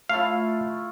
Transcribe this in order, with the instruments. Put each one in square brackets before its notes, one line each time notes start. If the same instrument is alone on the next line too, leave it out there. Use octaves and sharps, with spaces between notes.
[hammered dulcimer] A3 E4 F4 [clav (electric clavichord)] F5